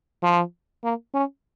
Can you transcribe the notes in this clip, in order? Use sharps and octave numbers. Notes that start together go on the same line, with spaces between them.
F3
A#3
C#4